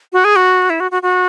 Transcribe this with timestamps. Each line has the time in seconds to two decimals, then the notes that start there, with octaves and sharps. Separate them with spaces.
0.13 F#4
0.24 G#4
0.36 F#4
0.70 E4
0.80 F#4
0.91 F#4
1.03 F#4